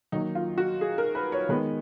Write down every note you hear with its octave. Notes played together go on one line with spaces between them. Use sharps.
D#3 F#3 A#3 D#4
F4
F#4
G#4
A#4
B4
C#5
D#3 G#3 B3 B4